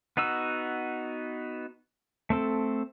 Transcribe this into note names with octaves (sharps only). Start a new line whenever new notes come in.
B3 D#4 F#4 E6
A3 C4 A4